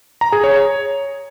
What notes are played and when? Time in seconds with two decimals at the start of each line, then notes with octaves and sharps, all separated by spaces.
0.21 A#5
0.32 G#4
0.44 C#5